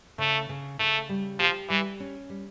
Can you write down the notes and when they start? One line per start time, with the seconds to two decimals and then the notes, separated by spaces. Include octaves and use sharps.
0.18 C#3 A3
0.49 C#3
0.79 C#3 A3
1.09 G3
1.39 F3 G4
1.69 E3 G3
2.00 C#4
2.30 G3